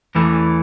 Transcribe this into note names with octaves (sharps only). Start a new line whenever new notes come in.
E2 E3 A3